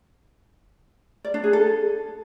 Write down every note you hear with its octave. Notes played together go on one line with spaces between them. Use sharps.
D5
D4
G#4
A4